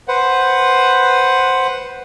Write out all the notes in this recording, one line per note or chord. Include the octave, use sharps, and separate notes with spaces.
B4 C5 F#5